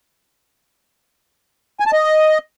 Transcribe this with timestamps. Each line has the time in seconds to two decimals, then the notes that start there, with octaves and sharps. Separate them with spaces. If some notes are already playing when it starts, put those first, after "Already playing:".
1.80 G#5
1.86 A5
1.93 D#5